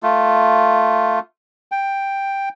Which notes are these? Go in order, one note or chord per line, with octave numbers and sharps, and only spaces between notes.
A3 F4
G5